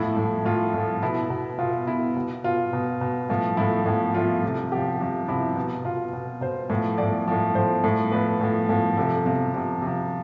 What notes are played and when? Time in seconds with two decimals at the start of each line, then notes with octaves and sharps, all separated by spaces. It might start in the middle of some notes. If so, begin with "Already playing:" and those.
Already playing: A2 F3 E4
0.17 A2 F3
0.45 A2 F3 F4
0.74 A2 F3
1.03 B2 E4
1.30 B2
1.58 B2 F4
1.87 B2 E4
2.16 B2
2.44 B2 F4
2.73 B2
3.01 B2
3.29 A2 F3
3.57 A2 F3 E4
3.86 A2 F3
4.15 A2 F3 F4
4.42 C3 F3
4.72 C3 F3 G4
5.00 C3 F3
5.28 C3 F3 E4
5.56 B2
5.85 B2 F4
6.13 B2
6.41 B2 C5
6.70 A2 F3
6.98 A2 F3 D5
7.28 A2 F3
7.55 A2 F3 C5
7.84 A2 F3
8.12 A2 F3 B4
8.41 A2 F3
8.69 A2 F3
8.97 C3 F3 A4
9.26 C3 F3
9.54 C3 F3
9.82 C3 F3